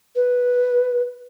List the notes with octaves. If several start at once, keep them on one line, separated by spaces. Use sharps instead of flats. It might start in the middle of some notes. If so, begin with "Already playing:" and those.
B4